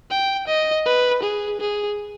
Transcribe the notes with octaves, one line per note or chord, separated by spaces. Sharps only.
G5
D#5
B4
G#4
G#4